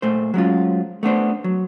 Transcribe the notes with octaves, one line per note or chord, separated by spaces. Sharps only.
A#2 A3 C5
F#3 G#3 C#4 F4
A3 B3 D4 C5
F#3